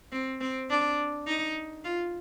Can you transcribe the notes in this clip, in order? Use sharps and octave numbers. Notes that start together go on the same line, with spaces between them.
C4
C4
D4
D#4
F4